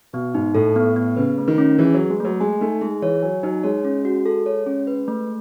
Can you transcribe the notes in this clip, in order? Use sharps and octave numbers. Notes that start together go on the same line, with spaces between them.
B2 B3
G#2 D#4
A2 A4
B3
B3
C#3 B4
A3
D#3
C#4
E3 G#4
F#3
B4
G#3
F#3 A3
G#3 G#5
A3 D#4
G#3 G#4
E3 C#5
F#3 G#5
F#3 D#4
G#3 C#5
C#4
F#4
A4
C#5
C#4
B4
A3